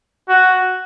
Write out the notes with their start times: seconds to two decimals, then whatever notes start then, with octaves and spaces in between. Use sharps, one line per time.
0.29 F#4